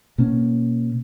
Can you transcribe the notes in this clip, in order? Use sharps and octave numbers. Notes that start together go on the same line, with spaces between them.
B2 A#3 C#4